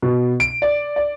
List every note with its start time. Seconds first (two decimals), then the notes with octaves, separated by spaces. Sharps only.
0.02 B2
0.40 D7
0.62 D5
0.96 D5